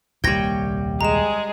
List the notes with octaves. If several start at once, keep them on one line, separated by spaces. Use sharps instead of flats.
D#1 C2 G3 A#3 C#5 G5 G#6 A#6
G#3 G#4 A#5 E7